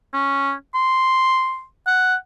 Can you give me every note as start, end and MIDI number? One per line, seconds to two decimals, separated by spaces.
0.14 0.52 61
0.75 1.63 84
1.87 2.15 78